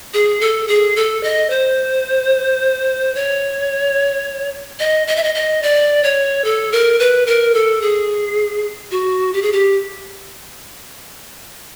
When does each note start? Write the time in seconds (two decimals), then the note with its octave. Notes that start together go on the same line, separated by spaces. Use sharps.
0.14 G#4
0.41 A4
0.68 G#4
0.96 A4
1.23 D#5
1.50 C5
3.15 C#5
4.80 D#5
5.07 D#5
5.16 E5
5.24 D#5
5.35 D#5
5.63 D5
6.03 C#5
6.44 A4
6.72 A#4
6.99 B4
7.26 A#4
7.54 A4
7.82 G#4
8.91 F#4
9.33 G4
9.42 G#4
9.53 G4